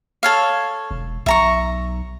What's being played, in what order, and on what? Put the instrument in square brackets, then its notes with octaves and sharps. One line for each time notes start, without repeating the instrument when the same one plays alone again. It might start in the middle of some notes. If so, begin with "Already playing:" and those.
[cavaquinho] A4 C#5 F5
[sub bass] E1
[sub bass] B1 [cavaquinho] E5 A#5 C#6